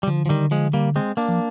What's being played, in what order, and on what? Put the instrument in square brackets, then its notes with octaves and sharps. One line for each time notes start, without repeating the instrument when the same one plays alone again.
[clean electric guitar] G3
[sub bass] D3 [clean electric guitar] F3
[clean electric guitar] F3
D#3 G3
F3 G#3
G3 A#3
G#3 C4
A#3 D4
[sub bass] F3